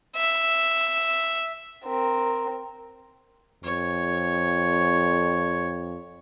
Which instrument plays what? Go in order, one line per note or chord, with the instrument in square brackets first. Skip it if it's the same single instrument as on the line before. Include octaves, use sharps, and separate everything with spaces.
[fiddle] E5
[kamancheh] C4 A#4
[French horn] F2 [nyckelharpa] C#5